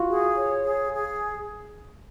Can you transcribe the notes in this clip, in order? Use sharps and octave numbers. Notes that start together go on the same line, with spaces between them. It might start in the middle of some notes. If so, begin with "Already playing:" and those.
Already playing: F4 F#4
G#4
C#5
G#4
G#4